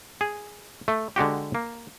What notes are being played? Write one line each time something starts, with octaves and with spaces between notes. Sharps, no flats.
G#4
A3
D3 G#3 F#4 G4
A#3